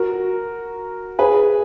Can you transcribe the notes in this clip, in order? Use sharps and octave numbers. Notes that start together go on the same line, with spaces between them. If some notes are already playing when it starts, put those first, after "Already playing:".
Already playing: F#4 A#4
G#4 B4